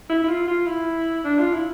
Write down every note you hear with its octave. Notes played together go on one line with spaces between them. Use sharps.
E4
E4
F4
F4
E4
D4
F4
E4